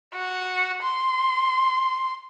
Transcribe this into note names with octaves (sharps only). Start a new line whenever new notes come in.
F#4
C6